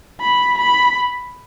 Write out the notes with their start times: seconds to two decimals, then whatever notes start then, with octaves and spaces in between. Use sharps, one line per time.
0.21 B5
0.59 B5